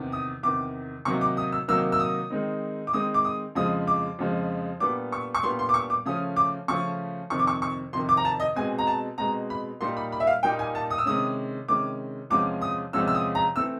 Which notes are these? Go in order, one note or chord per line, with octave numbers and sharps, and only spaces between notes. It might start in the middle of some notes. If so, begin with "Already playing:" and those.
Already playing: E2 C3 D#3
D#6
E2 C3 D#3 D6
C3 D#3 F#3 A#3 D#4 C#6
D6
D#6
E6
C3 D#3 F#3 A#3 D#4 E6
E6
D#6
D#3 G#3 C4 D#4
D6
D#3 G#3 C4 D#4 D#6
D6
D#6
F2 C#3 F3 G#3 D#6
D6
F2 C#3 F3 G#3
A#2 G3 B3 D4 D6
C#6
C#6
A#2 G3 B3 D4 C6
C6
D6
C#6
D6
C#3 F3 A3 C#4 D#6
D6
C#3 F3 A3 C#4 C#6
F2 C3 D#3 C#6
D6
C#6
C#6
F2 C3 D#3 C6
D6
A#5
A5
D#5
B2 G#3 C4 G#5
A#5
A5
B2 G#3 C4 A#5
B5
A#2 G3 A#3 D#4 C6
B5
B5
E5
F5
A#2 G3 A#3 D#4 G5
G#5
A5
D#6
E6
C3 D#3 G#3 C#4 D#6
C3 D#3 G#3 C#4 D6
E2 C3 F3 G#3 C#4 D6
D#6
E2 C3 F3 G#3 C#4 E6
E6
D#6
A#5
E3 A3 C4 E6